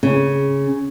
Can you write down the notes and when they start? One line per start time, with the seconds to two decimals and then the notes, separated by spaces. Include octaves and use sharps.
0.03 C#3